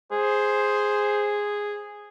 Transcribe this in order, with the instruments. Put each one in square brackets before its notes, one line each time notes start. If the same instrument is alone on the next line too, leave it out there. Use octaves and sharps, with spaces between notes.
[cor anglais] G#4 [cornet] C5